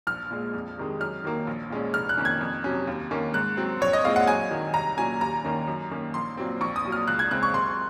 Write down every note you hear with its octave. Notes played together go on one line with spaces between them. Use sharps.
A#1 F6
A#2 G#3
F2
C3 D#3 G#3
F#2 F6
D#3 F#3 A#3
A#1
A#2 G#3 C#4
F1 F6
F#6
F2 D#3 A#3 C#4
G#6
F2
C3 F#3 C#4
D#2
D#3 A#3 C#4
G#2 F#6
F#3 C4
A#1 C#5
D#5
A#2 G#3 C4 F5
F#5
F#2 G#5
D#3 F#3
C2 A#5
A#2 F#3 C#4 G#5
D#2 A#5
D#3 A#3 C#4
F#2
D#3 A#3 C#4
A#1 C6
A#2 F#3 C4
A#1 C#6
D#6
A#2 F#3
F6
C#2 F#6
G#6
C#3 G#3 C4 F#6
C#6
F#1 C6